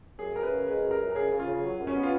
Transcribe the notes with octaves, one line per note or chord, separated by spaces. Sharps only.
F#2 G#4
F#2 A#4
B4
C#3
G#3 B4
F#2
A#4
F#2
A#4
C#3 G#4
C#3
F4
C#3
F#3
F#2
C#4
B3
F4